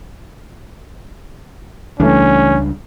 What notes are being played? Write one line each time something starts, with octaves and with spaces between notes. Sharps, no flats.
C#2 C#3 E3 G3 A3 C#4 D4